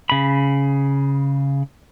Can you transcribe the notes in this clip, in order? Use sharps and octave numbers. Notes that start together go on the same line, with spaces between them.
C#3 B5